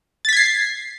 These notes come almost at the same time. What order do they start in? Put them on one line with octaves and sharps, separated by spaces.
A6 B6 G#6 C7